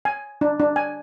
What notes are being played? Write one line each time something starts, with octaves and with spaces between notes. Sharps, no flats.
G#5
D4
D4
G#5